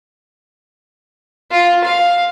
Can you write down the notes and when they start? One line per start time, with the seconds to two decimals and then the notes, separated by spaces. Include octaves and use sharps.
1.51 F4
1.85 F5